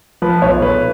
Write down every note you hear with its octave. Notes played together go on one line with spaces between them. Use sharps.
F3 B4
B1 C#5
B1 B4